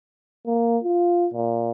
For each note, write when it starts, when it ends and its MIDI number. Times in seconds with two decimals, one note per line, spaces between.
0.46 0.78 58
0.84 1.29 65
1.34 1.71 46